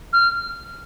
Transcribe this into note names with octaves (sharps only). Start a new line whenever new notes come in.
F6